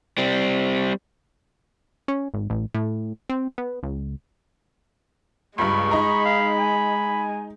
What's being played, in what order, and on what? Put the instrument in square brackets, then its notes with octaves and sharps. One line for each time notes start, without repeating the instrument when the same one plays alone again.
[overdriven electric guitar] G3 C4
[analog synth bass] C#4
G#1
A1
A2
C4
B3
C#2
[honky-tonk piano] C#2 G2 [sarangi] G#3 [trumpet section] B4 B5 [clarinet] C#6
[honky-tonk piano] D#4 A#5 [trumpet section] B5
[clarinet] F5
G#5